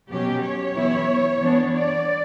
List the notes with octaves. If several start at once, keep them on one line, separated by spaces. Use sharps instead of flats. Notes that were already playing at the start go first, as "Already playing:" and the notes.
B2 F#3 C#4 G4
C#5
E3 B3 E4
E3 B3 D4
D5